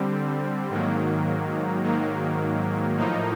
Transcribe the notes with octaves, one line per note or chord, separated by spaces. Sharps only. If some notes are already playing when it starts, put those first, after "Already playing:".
Already playing: D3 G3 C4
G#2 D#3 F#3 A#3
G#2 D#3 F#3 A#3
A2 F3 A#3 D#4